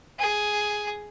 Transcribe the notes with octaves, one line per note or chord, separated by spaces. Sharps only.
G#4